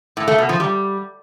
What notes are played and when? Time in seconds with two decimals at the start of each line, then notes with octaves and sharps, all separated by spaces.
0.17 A2
0.28 A3
0.38 B2
0.49 F3
0.60 G3